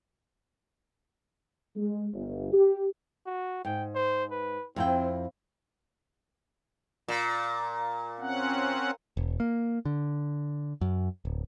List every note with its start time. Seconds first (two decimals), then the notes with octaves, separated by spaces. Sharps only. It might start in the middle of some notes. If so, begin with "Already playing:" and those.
1.76 G#3
2.14 G1
2.53 G4
3.26 F#4
3.65 G#2 G5
3.95 C5
4.31 B4
4.76 F2 C4 E4 G5
7.08 A#2
8.20 C4 C#4 F#5
9.17 E1
9.40 A#3
9.85 D3
10.81 F#2
11.25 D1